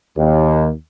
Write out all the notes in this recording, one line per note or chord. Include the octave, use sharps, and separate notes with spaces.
D#2